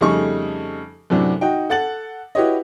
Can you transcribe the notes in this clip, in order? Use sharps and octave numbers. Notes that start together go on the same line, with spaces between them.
F2 C#3 G3 A3 D#4 C#6
F#2 A2 C3 F#3 D4
D#4 F#4 G5
A4 F#5 A6 F#7
E4 F#4 G4 B4 C#5 D#5